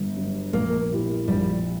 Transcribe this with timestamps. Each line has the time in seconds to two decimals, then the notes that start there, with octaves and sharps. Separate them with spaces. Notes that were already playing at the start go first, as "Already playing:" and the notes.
Already playing: G1
0.17 G2 F#3
0.53 A#1 A#3
0.91 A#2 A#3 E4 G4
1.28 A#1 G3